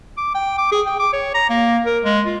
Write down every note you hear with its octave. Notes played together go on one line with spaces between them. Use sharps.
D6
G5
D6
G#4
G5
D6
C#5
A#5
A#3
A#4
G#3
F4